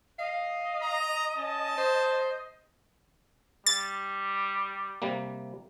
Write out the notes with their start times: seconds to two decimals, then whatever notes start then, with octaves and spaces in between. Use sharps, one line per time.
0.19 D#5 F5
0.83 A#5
1.37 C#4 A5
1.78 C5
3.67 G3 A6
5.02 C3 G3 A#3